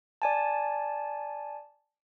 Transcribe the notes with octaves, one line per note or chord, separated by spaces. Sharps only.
D5 G#5 A5